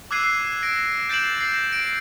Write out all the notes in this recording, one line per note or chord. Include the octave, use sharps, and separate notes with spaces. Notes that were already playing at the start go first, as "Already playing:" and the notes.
D6 E6 F#6 G#6 C7 D#7
C7
A#6 D7
G6 A6 C7 D7 E7 F#7
A#6 C7 F#7
A#6 D7